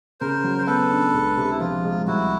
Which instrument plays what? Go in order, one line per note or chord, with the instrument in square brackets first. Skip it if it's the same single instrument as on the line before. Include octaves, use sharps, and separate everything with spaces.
[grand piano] C#3 [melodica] A#4 C5
[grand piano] F#3
[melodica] C5
[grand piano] B3 [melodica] A4 B4
[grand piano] D4
C#2
C3
[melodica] E4
[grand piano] F3 [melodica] F4
[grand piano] G#3
[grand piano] C2 [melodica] E4 F#4